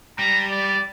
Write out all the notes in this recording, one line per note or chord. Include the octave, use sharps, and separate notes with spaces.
G3 A#5
D5